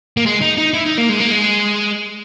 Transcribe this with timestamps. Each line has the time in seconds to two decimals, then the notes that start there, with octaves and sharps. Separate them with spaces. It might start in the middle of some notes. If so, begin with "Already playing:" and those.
0.17 A#3
0.26 G#3
0.41 D#4
0.58 D#4
0.74 E4
0.86 D#4
0.97 A#3
1.09 G#3
1.20 A#3
1.31 G#3